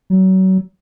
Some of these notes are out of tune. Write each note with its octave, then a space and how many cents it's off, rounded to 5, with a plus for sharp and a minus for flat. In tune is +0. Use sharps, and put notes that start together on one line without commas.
F#3 +30